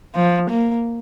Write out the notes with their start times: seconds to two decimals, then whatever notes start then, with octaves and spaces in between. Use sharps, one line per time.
0.15 F3
0.50 A#3